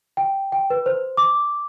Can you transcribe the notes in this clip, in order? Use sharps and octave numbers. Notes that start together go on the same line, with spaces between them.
G5
G5
B4
C5
D6